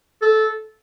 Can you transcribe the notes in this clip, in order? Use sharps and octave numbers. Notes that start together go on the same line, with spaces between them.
A4